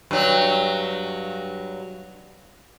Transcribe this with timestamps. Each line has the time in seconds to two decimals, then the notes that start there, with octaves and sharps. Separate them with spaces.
0.11 G2 F#3